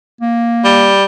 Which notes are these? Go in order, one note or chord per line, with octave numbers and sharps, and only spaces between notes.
A#3
G3